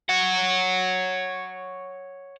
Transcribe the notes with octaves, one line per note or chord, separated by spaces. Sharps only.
C#5 F#5